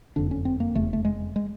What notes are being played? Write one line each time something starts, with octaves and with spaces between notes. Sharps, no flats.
F#1 F2 D3 D4
C#4
C4
A#3
F1 E2 C#3 A3
A3
G#3
G#3